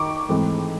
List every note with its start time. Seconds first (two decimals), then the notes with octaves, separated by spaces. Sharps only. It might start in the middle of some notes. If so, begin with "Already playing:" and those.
Already playing: D#3 D#4 C#6 D6
0.29 G#2 E3 A3 C4